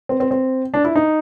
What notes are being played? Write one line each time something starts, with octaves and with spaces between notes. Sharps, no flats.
C4
C4
C4
D4
E4
D#4